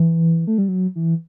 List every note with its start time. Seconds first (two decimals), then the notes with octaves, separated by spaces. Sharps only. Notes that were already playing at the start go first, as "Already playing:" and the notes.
Already playing: E3
0.47 A3
0.58 G3
0.68 F#3
0.96 E3